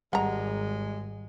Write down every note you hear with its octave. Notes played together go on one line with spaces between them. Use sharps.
G#1 G3 G#3 F#5 A#5